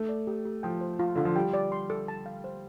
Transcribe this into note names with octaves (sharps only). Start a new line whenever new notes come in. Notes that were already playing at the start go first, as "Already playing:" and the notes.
Already playing: A3
D5
G4
G4
F3 G5
C5
F4
D3 F4
F3
G3 G5
D5
C6
A4
A5
F5
C5